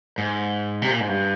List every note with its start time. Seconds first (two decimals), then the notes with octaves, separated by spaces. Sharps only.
0.18 G#2
0.82 C3
0.91 A#2
1.00 G#2
1.08 G2